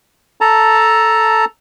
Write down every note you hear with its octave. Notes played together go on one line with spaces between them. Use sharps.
A4 A5 A#5